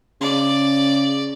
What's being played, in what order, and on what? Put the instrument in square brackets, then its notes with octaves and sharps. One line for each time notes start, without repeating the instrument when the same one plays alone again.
[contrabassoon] C#3 [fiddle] D5